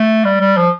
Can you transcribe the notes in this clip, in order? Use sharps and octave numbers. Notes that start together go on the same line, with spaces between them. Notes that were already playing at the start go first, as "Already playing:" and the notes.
Already playing: A3
G3
G3
F3